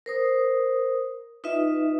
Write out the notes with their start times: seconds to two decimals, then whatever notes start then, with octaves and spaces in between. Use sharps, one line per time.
0.06 A#4 C5 D#6
1.44 D#4 F4 B4 D#5 E5